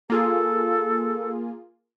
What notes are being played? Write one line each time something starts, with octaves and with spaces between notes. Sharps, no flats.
A#3 F4 G#4 A4